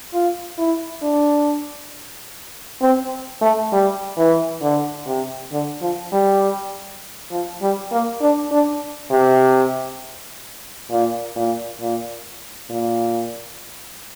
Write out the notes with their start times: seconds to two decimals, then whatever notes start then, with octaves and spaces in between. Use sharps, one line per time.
0.14 F4
0.58 E4
1.02 D4
2.82 C4
3.42 A3
3.72 G3
4.17 E3
4.62 D3
5.06 C3
5.52 D3
5.81 F3
6.12 G3
7.31 F3
7.62 G3
7.92 A#3
8.21 D4
8.52 D4
9.11 C3
10.91 A#2
11.36 A#2
11.81 A#2
12.70 A#2